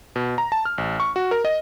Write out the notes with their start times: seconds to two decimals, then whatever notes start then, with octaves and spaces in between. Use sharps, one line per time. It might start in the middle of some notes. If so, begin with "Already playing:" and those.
0.16 B2
0.38 A#5
0.52 A5
0.65 F6
0.78 A1
1.00 C#6
1.16 F#4
1.31 A#4
1.45 D#5